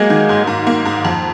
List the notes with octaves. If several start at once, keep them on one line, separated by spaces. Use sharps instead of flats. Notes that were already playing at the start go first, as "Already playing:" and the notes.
Already playing: F#3 G#3 A#3
D#3
G#2
G#2
A#3
G#2
F2